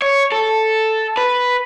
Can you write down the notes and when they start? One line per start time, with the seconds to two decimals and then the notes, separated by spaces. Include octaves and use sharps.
0.02 C#5
0.32 A4
1.17 B4